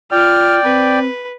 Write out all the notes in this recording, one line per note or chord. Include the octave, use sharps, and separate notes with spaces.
F4 D5 G5 F6
C4 B4